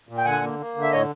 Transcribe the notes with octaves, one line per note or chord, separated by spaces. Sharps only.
A#2
G5
D3 F#5 G#5
A#3
A#3
D3
E5
A2 C#5 D#5